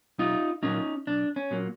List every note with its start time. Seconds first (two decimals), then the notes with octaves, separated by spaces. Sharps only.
0.19 B1 D#4 F4
0.63 A#2 F#3 A#3 C#4 D#4
1.07 B1 D4
1.36 C#4
1.51 A#2 F#3 A#3